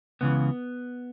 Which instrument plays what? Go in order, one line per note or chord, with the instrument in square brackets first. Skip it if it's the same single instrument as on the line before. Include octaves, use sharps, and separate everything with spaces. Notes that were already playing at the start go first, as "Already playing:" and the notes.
[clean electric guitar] C#2 C#3 E3 B3